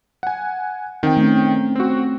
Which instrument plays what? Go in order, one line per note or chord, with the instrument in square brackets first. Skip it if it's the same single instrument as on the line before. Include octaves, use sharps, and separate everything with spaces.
[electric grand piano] F#5 G#5
[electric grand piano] D#3 G5 [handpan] C4
[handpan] A3 C#4
[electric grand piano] C4 F#4